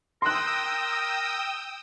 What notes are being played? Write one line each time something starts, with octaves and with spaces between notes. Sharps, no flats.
A#4 G5 C6 D#6 E6 F#6